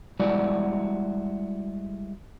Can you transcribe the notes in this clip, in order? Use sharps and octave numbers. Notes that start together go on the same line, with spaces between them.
G3 G#3 E4 F#4 D5